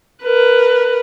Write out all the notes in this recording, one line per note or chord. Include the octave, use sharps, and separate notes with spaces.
A#4 B4